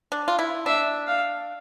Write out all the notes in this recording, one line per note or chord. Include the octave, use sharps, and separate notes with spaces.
D4
F4
E4
D4 E5
F5